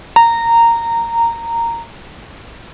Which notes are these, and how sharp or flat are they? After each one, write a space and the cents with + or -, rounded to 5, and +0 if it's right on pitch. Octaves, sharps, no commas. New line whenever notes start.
A#5 -10